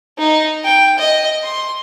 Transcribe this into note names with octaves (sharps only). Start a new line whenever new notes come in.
D#4
G5
D#5
C6